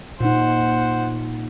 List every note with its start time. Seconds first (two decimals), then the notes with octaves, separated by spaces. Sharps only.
0.20 A#2 D#4 C5 F#5